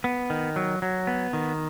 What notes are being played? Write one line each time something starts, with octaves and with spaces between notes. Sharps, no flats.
B3
D#3
F#3
F#3
B3
D#3